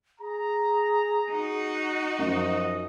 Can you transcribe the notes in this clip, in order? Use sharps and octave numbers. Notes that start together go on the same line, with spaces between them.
G#4 A#5
D#4 F#4
F#2 F3 F#3 D#5